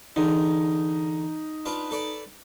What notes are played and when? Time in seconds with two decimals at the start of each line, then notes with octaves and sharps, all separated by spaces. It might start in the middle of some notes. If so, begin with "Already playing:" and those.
0.16 E2 D3 D#4
1.66 D4 F4 B4
1.91 A4 B4 D5